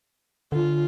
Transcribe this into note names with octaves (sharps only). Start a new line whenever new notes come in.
D3 F4